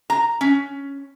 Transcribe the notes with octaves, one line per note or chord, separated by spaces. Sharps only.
A#5
C#4